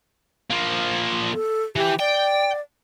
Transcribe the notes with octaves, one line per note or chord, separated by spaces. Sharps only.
F3 A#3
A4
E3 G4
D5 G5